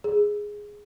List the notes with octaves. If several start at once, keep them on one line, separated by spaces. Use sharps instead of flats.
G#4